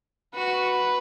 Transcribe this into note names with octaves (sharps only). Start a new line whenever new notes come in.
F#4 B4